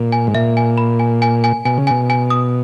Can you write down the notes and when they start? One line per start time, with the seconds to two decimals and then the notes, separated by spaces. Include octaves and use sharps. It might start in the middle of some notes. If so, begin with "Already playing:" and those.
Already playing: A#2
0.12 G#5
0.27 G#2
0.35 A#2 E5
0.57 G#5
0.78 B5
0.99 G#5
1.22 G#5
1.44 G#5
1.65 B2 G#5
1.78 C#3
1.87 B2 G#5
2.10 G#5
2.30 D#6